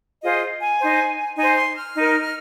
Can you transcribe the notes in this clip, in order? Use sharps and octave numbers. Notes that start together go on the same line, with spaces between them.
F4 G#4 C5 D#5
G#5
D#4 C5
D#4 C5 G#5
C6
F6
D#4 A#4